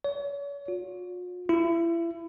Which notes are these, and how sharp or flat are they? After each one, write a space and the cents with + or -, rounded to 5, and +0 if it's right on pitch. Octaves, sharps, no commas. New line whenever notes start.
C#5 +40
F4 +45
E4 +30